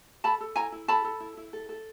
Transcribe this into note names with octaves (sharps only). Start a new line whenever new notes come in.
A4 A5 B5
A4
E4 G#5 A#5
E4
A4 A5 B5
A4
E4
E4
A4
A4